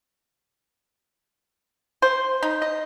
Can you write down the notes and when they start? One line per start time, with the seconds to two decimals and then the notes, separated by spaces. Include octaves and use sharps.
2.02 C5
2.43 D#4
2.62 D#5